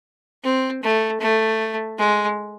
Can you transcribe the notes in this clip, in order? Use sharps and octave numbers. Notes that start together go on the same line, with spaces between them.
C4
A3
A3
G#3